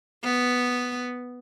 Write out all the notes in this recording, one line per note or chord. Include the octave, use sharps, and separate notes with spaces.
B3